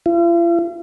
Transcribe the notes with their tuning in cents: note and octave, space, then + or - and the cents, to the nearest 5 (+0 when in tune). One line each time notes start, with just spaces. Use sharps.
F4 -45